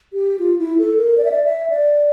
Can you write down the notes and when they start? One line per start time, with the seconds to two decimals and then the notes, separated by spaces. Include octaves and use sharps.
0.13 G4
0.39 F4
0.59 E4
0.78 A4
0.98 A#4
1.18 D5
1.25 E5
1.32 D5
1.44 E5
1.70 D5